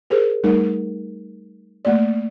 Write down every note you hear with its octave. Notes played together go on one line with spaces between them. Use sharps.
G4 G#4 A#4 C5
G3 A3 D#4 A#4
A3 A#3 D5